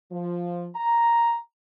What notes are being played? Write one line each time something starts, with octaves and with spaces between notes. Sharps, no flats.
F3
A#5